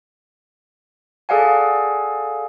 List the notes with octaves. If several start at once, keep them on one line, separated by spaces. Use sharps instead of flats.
G#4 A4 D5 F5 F#5 G#5